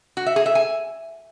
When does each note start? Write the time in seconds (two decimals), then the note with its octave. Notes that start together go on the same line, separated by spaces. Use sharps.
0.17 F#4
0.26 E5
0.36 G#4
0.46 E5
0.55 G#5